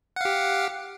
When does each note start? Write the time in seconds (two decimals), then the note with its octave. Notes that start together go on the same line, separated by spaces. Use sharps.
0.16 F#5
0.21 F5
0.25 G4